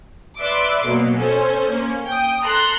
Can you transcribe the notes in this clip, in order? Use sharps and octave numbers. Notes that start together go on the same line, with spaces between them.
B4 D5 E5 C6 D6
B2 F#3 A#3
C#4 A4 C5
A#3 C#4
G5 D#6
A4 A#5 C6 F#6